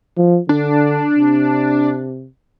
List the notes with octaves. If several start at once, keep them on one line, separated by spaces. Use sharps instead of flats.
F3
D3 D4
C3